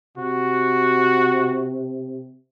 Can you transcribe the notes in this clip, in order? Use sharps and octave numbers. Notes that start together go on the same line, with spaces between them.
C3 F#4